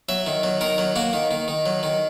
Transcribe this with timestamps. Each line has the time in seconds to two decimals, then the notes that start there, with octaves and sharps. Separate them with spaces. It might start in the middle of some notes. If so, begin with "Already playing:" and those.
0.09 F#3 E5
0.26 D#3
0.43 F#3
0.61 D#3 A#4
0.78 F#3
0.96 A#3 F#4
1.13 D#3
1.31 D#3
1.48 D#3
1.66 F#3
1.83 D#3